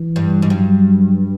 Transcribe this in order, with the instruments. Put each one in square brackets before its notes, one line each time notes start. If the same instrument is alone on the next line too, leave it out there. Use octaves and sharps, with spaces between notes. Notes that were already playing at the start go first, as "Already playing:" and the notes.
Already playing: [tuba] E3
[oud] G2
G#2
[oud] G2 [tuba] F#3